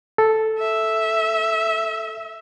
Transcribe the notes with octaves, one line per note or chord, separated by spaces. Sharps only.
A4
E5